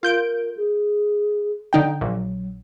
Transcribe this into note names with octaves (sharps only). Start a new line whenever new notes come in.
F4 A#4 G6 D7
G#4
D3 D#4 G5
A#1 F#3